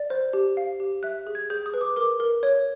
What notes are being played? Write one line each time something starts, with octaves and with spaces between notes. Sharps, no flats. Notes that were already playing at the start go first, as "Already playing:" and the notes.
Already playing: D5
C5
G4
F5
G4
E5 F#6
G#4
G#6
G#4 G6
D#6
B4
D6
A#4 D6
A#4
C#5